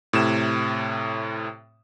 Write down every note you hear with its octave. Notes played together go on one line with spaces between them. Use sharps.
A2 C3 E7